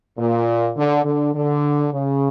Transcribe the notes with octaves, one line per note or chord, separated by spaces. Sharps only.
A#2
D3
D3
D3
C#3